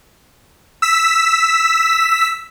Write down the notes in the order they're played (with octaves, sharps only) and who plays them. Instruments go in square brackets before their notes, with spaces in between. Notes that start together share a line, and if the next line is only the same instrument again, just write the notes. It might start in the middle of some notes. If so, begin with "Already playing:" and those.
[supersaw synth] E6 B6